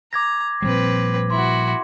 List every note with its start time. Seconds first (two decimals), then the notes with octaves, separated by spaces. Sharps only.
0.13 A#5 D6 G#6 A#6
0.62 A#2 F3 G3 C4 B4
1.31 E4 F#4 C6